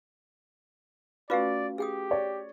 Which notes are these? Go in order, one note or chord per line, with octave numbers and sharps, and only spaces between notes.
A3 C#4 F4 F#4 B4 D5 F5
G4 G#4 G5 D#6
C#5 D5